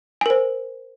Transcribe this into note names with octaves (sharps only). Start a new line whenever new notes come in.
A#4 C5 G#5